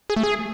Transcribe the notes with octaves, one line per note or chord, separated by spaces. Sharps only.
G#4
A3
G#4